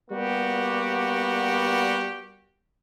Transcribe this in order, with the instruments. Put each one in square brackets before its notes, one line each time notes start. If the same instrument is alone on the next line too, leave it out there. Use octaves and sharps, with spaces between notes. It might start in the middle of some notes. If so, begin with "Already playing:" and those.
[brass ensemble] G3 A#3 B3 F#4 G4